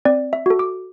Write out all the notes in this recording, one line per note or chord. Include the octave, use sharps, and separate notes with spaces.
C4 D5
E5
F#4 A4
D6